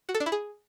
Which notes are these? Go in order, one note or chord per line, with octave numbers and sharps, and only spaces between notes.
F#4
A4
D4
E4
G#4